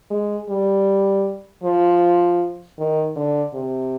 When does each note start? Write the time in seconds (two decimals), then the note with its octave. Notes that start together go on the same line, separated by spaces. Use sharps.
0.11 G#3
0.49 G3
1.63 F3
2.79 D#3
3.16 D3
3.54 C3